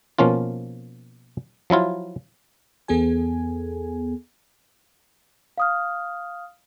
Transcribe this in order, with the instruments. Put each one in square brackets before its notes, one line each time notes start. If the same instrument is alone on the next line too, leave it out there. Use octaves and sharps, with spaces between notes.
[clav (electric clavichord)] B2 F3 A#3 C#4 F4
F3 F#3 E4 F4
[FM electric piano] E2 B3 G#4 A4 G#5
[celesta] F5 D#6 F6